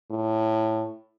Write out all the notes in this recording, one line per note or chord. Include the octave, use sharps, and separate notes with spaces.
A2